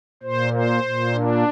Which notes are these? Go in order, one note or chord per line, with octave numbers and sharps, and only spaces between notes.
A#2 C5
C5
A#2
D4